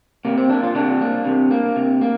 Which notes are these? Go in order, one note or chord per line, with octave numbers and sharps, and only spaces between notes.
C3 A#3
C4
A#3 D4
F4
C3 D4
A#3
C3
A#3
C3
A#3